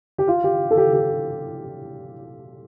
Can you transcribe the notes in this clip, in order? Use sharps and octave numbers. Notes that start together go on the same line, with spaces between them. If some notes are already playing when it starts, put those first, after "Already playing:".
G4
F4
G4
A4
G4
G4